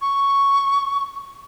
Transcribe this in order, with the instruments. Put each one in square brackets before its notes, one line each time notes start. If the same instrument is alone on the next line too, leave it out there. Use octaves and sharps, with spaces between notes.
[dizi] C#6